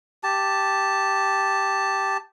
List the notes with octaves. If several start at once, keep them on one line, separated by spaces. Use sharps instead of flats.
G4 A5